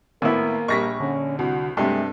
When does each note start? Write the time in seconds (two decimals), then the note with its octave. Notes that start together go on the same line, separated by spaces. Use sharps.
0.22 G#1 A2 A#3 B3 E4 A#4
0.68 A#1 G3 C#6 A#6 B6
1.00 D3 C#4
1.39 C2 F#4
1.77 G2 C3 G#3 A3 A4